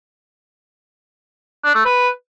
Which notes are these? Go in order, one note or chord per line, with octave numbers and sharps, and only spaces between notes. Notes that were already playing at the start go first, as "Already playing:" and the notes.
D4
A3
B4